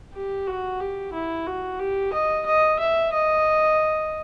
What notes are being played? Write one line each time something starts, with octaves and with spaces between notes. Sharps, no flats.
G4
F#4
G4
E4
F#4
G4
D#5
D#5
E5
D#5